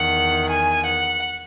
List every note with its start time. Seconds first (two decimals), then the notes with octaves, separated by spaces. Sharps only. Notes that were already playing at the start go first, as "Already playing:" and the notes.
Already playing: E2 D#3 F#5
0.49 G#5
0.85 F#5